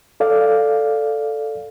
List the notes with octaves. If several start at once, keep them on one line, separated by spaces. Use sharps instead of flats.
A4 D5 F5